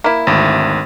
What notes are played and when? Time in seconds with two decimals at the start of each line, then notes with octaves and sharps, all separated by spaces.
0.04 A#3 E4
0.27 G#1 D2